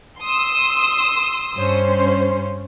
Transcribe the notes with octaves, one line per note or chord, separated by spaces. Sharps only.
C6 D#6 E6
G2 C#4 C5